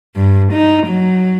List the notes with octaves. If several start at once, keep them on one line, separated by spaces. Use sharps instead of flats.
G2
D#4
F#3